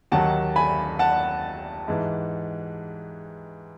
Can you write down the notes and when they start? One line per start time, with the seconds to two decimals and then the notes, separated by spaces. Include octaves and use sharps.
0.12 D#2 D#3 F#3 F#5 A5
0.56 G#5 B5
0.99 F#5 A5
1.88 G#2 E3